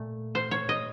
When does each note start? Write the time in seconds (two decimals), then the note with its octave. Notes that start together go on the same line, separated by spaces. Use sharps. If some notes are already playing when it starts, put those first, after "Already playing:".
Already playing: A#2 A3
0.35 C5
0.51 C#5
0.69 D#5